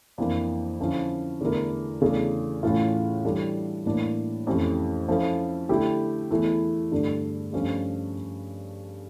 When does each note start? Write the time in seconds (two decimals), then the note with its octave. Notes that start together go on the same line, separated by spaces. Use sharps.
0.18 F2 E3 A#3 D4
0.79 D3 F3 C#4 E4
1.40 E2 D3 A3 E4 A#4
2.01 E2 C#3 E3 A3 D4
2.63 A2 E3 A3 C#4 F4
3.25 E3 G3 D4 A4
3.86 A2 E3 A#3 D4
4.47 F2 E3 A3 C#4 G4
5.08 F3 C#4 E4 A4
5.69 D3 A3 E4 G4
6.31 E2 E3 A3 E4
6.91 G2 D3 A3 D4
7.53 G2 F3 A3 C#4